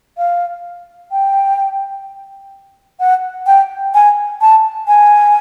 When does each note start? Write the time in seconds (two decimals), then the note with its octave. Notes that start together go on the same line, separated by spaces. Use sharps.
0.17 F5
1.11 G5
3.00 F#5
3.47 G5
3.94 G#5
4.41 A5
4.88 G#5